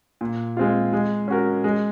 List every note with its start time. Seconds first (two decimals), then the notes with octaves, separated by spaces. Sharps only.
0.21 A#2
0.57 G#3 C4 F4
0.93 G#3
1.28 C#4 F#4 A#4
1.64 G#3